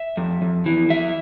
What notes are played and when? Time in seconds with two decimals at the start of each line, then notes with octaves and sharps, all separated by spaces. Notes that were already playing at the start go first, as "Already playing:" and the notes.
Already playing: E5
0.17 F2
0.42 F2
0.66 E3
0.90 F2 E5